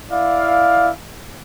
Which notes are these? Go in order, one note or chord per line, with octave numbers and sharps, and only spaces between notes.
E4 D5 F5